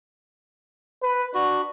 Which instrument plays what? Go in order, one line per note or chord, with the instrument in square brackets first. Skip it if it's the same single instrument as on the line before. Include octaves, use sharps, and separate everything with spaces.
[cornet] B4
[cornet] D4 [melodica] F#4